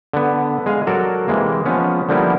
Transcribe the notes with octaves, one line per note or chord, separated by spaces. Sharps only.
D3 B3
G#3 G#4 F5
F#3 F#4 A4 A#4 D5
C3 E3 G#3 A#3
F3 G#3 B3 C#4
D3 F3 G3 A#3 B3 E4